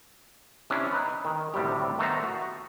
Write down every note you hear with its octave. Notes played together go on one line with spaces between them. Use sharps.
C3 C#4 D4 E4
D#4 B4
D#3
D2 A2 C3 G3 G4
D#3 A3 B3 C5 A#5
F#4